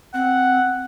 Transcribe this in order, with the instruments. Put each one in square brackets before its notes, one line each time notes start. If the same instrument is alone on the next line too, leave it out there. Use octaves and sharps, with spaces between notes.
[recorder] C4 [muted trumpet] F#5